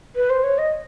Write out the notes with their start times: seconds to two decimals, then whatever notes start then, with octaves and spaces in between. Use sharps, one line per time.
0.16 B4
0.30 C5
0.44 C#5
0.58 D#5